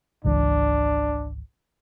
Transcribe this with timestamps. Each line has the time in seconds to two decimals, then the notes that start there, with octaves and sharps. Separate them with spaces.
0.24 G#1 C#2 E3 D4